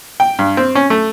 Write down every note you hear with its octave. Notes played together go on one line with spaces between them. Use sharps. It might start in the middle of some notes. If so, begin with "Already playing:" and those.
G5
G2
C4
C#4
A3